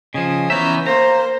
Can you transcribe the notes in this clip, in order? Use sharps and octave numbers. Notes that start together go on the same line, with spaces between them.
C#3 F3 D#5 G#5
E3 B3 C#4 E5 A#5 G6
A#3 C5 A#5